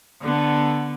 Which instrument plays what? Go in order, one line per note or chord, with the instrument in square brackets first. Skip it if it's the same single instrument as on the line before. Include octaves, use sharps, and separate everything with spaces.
[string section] D3 B3